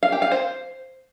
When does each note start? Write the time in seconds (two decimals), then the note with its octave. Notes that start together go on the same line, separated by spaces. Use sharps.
0.03 F5
0.12 G4
0.22 F5
0.32 C5